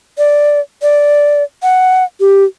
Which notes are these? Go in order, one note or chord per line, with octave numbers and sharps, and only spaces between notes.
D5
D5
F#5
G4